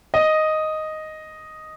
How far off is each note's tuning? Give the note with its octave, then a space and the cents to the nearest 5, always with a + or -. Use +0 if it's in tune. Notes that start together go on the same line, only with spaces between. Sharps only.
D#5 +0